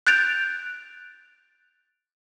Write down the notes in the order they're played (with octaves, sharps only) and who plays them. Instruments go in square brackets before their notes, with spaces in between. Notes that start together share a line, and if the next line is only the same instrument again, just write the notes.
[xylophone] F#6 G6 A6 D7 F7